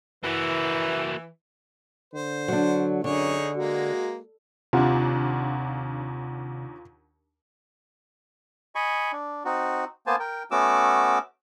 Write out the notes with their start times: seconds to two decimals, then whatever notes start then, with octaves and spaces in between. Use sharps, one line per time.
0.24 E3 A#3 F#4
2.14 D3 C5
2.48 F#3 D4
3.04 F#2 D3 D#4 G#4 C#5
3.56 G#3 A#3 F#4
4.73 D#2 C3 D4 F4 F#5
8.75 D#5 G#5 B5 C#6
9.12 D4
9.45 C4 D#4 F#4
10.07 A#3 B3 C5 G#5 A5
10.20 A#4 G5
10.51 A3 B3 C#4 F#4 D6 E6